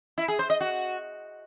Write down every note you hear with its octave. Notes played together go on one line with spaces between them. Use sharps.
E4
G#4
C5
D#5
F#4